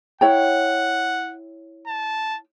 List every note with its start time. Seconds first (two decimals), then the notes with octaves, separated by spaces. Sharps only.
0.21 E4 C#5 F#5 G5
1.87 A5